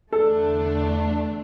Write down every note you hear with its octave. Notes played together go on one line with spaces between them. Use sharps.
E2 D3 A3 D4 A4